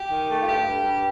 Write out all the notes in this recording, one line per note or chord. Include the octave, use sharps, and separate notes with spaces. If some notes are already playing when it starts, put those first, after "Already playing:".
Already playing: G4
D#3
A3
F4
G2 G4
G2
G2